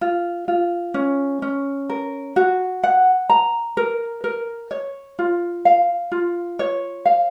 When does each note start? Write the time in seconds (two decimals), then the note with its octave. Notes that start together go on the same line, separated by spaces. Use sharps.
0.01 F4
0.48 F4
0.94 C#4
1.42 C#4
1.90 A#4
2.36 F#4
2.83 F#5
3.30 A#5
3.77 A#4
4.24 A#4
4.71 C#5
5.19 F4
5.65 F5
6.12 F4
6.59 C#5
7.06 F5